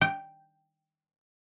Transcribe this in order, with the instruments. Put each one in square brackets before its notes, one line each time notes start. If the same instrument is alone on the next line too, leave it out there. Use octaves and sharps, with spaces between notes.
[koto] G5